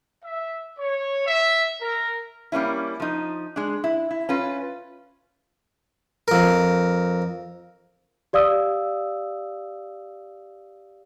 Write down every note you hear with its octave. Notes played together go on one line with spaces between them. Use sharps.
E5
C#5
E5
A#4
G3 A#3 C#4 E4
F3 D#4
G#3 D4
E4
E4
C#4 F4 B4
F2 A#4
G4 D5 F5 D#6 E6